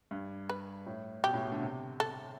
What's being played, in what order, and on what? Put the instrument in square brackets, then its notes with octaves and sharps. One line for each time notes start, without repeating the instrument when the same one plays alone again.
[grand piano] G2
[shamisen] B4
[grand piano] A2
[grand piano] B2 [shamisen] G4
[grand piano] A2
B2
D3
C3
[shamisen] A4